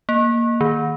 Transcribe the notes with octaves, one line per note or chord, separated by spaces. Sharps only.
A#3
D#3